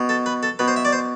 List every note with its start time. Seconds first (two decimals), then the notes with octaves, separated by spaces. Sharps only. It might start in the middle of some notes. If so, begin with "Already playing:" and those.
Already playing: B2
0.09 A4
0.26 B4
0.43 A4
0.59 B2 B4
0.68 C5
0.76 E5
0.85 D5
0.93 C5